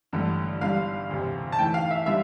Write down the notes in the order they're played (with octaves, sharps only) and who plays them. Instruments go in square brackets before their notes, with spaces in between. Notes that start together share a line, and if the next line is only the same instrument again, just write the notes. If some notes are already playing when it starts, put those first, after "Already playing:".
[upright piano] A1 G2 D3 A3
[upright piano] G1 G2 D3 G3 [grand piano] F5
[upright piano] E1 D2 C3
[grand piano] A5
[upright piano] E2 E3 A3 [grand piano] G5
[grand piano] F5
E5
[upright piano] D3 G3 [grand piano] E5